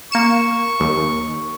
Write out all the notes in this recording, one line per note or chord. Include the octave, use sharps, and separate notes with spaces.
A#3 C#6 C#7 E7
D#2